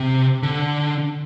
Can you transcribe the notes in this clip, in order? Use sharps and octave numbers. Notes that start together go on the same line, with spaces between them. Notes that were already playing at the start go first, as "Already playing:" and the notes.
Already playing: C3
D3